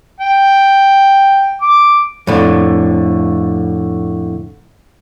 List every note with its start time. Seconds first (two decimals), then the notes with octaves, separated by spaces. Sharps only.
0.21 G5
1.61 D6
2.27 F2 A2 D3